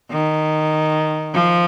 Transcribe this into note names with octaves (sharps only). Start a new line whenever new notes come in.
D#3
F3